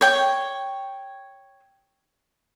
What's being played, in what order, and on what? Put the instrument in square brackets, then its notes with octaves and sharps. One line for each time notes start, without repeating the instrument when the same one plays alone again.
[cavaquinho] C#5 G5